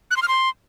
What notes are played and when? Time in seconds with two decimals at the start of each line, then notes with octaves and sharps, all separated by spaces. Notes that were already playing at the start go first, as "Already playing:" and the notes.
0.11 F#6
0.17 C6
0.22 F6
0.28 C6